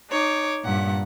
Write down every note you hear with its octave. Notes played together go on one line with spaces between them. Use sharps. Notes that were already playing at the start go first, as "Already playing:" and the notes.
D#4 C#5 D6
G2 A#2 F#5